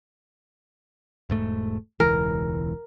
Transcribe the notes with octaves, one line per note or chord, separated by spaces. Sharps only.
E1 G#2 A3
E1 C#2 E3 A#4